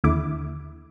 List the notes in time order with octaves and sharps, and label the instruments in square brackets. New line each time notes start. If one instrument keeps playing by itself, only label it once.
[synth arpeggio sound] D#2 D3 E4 D6